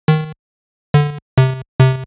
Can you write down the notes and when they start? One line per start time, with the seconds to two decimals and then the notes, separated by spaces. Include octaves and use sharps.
0.08 D#3
0.94 D3
1.38 C3
1.80 C3